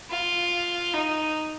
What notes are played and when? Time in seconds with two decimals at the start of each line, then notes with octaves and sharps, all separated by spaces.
0.11 F4
0.93 D#4